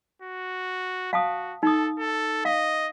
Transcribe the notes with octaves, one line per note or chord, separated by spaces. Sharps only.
F#4
F#4 F5 A5 D#6
D#4 A4 D#6
A4
D#5 F5